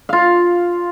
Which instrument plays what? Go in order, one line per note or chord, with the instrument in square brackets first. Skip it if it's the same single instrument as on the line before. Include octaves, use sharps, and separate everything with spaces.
[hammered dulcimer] F4 F5